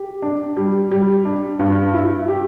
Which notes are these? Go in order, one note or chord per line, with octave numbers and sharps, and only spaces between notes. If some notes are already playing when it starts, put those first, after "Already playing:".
Already playing: G4
D4
G3
G3
D4
G2
E4
G4